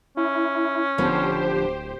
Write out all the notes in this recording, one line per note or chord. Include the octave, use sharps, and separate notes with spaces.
C#4 E4
D1 D3 F3 B3 G4 C5